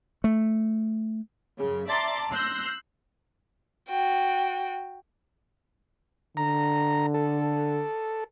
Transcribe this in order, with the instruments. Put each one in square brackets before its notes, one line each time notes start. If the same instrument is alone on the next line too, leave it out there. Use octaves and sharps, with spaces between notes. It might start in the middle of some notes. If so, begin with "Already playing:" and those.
[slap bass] A3
[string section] F#2 C#3
D5 E5 A5 A#5 C6 A6
C6 E6 F#6 G6 A#6 C7
[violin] F#4 G5
[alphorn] D3 [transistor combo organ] A#5
[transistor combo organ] A4